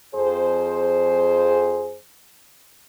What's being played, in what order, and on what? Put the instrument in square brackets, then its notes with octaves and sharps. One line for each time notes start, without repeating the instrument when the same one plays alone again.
[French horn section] F2 G#4 C5